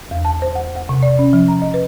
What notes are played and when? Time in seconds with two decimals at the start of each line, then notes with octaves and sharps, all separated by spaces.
0.11 E2
0.25 A5
0.42 C5
0.55 F#5
0.76 F#5
0.89 C3
1.03 D5
1.19 C#4
1.33 F3
1.48 A#5
1.62 D#5
1.74 B4